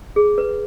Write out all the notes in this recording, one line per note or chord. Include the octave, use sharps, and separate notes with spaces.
G#4
B4